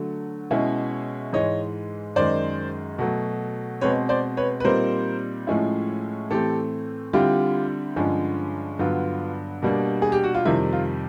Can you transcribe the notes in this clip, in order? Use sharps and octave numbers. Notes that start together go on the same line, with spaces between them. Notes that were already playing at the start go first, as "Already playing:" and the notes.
Already playing: D3 F#3 A3
B2 G#3 C#4 E4
G#2 E3 G#3 C#5 D#5
F#2 D#3 G#3 C5 D5
B2 F#3 A3
B2 G#3 C4 B4 C#5
C5 D5
B4 C#5
B4
A#2 G3 C4 D#4 A#4 C5
A2 F3 G#3 C#4 E4
A2 E3 A3 C4 G4 A4
D3 G3 C4 E4 F4 G4
G2 D3 F3 G#3 C#4
G2 D3 F#3 B3 F4
B2 G3 A#3 D4
G#4
G4
F#4
F4
F2 C3 D#3 G3 E4
F4